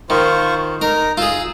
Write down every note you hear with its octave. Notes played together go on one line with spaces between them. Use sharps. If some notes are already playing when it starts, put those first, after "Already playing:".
D#3 F4 C5 C#6
D#4 A#4 A#5
F4 G#4 E6